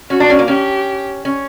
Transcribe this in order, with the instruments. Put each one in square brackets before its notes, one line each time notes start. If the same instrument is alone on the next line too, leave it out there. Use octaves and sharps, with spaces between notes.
[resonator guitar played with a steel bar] C#4 [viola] F#4
[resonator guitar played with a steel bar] D4
C#4
A#3
[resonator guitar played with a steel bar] C#4 [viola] G4
[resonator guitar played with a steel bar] C#4